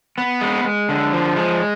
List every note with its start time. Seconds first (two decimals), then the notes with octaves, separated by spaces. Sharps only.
0.18 B3
0.41 G#3
0.64 G#3
0.89 D3
1.13 F3
1.36 G#3